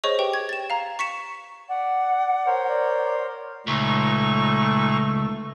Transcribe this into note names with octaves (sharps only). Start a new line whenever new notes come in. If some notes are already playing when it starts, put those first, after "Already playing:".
G#4 C5 C#5 D#5 C#6
G4 B4 G5
G#6
A6 E7
F5 A#5
C#6 B6 C#7 E7
D5 F#5
A#4 C5 C#5
D5
C#2 A#2 A3 D#4 C#6